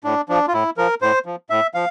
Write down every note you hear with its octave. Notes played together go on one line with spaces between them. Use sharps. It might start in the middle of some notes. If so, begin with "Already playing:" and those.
A2 D4
F3 D4
F4
A2 E4
F3 A#4
A2 C5
F3
A2 E5
F3 F5